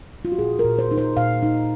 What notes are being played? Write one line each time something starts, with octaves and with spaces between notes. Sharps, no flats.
F4
F#4
A#2 G#4
A#4
A#2
C5
D#4
C5
A#2 F5
D#4